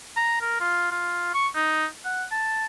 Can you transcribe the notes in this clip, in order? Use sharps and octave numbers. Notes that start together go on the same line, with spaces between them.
A#5
A#4
F4
F4
C#6
D#4
F#5
A5